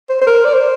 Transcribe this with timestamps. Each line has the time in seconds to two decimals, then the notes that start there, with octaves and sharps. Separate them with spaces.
0.09 C5
0.21 C5
0.27 A#4
0.45 D5
0.53 C5